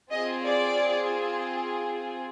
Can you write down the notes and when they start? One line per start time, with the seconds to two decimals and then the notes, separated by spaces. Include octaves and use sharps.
0.11 C4 F4 G#4 D#5
0.44 D5